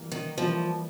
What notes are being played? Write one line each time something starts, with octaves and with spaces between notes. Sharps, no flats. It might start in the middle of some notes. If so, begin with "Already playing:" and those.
Already playing: E3 G3 A#3
D#3
E3 F3 G3 A#3